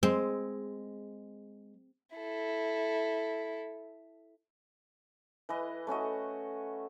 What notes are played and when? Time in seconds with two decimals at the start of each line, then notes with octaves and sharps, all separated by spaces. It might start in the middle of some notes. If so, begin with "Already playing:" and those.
0.03 G#3 C4
2.16 E4 A4
5.49 E3 B4 D#5
5.87 A3 C#4 F#4 D#5